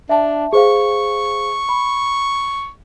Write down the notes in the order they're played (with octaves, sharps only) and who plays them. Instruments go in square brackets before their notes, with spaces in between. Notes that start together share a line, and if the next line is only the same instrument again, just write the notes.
[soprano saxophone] D4 [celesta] E5 A5
[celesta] G#4 C5 F5 [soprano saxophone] C#6
[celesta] B5